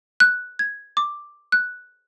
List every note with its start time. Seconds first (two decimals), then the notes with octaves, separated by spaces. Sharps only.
0.20 F#6
0.59 G#6
0.97 D6
1.52 F#6